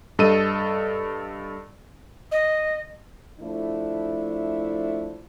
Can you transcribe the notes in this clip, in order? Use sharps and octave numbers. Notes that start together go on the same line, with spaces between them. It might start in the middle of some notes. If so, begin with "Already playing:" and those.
G2 A4 D#5 D#7
D#5
F3 A3 D4 E4